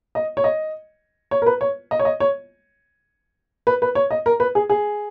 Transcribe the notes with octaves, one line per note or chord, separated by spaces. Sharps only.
D#5
C#5
D#5
C#5
A#4
B4
C#5
D#5
C#5
D#5
C#5
B4
B4
C#5
D#5
A#4
B4
G#4
G#4